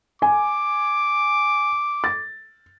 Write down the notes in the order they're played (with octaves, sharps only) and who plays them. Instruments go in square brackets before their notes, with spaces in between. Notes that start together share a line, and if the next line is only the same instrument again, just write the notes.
[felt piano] G#5 [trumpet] D6
[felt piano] A6